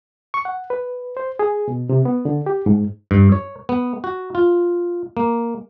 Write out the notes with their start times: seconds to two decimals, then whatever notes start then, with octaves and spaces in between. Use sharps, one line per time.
0.34 C#6
0.45 F#5
0.70 B4
1.17 C5
1.39 G#4
1.68 B2
1.89 C3
2.05 B3
2.25 D3
2.46 G4
2.66 G#2
3.11 G2
3.32 C#5
3.69 B3
4.04 F#4
4.35 F4
5.17 A#3